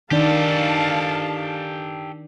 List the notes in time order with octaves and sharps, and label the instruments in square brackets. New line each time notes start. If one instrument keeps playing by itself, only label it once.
[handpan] D#3 D4 D5 [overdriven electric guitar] G4 A4 [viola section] F5 A5